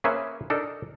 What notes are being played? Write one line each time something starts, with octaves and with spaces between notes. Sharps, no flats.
A#3 C#4 G#4 B4 C5 E5
D4 D#4 A4 A#4